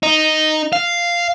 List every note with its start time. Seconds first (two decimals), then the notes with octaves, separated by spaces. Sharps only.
0.03 D#4
0.73 F5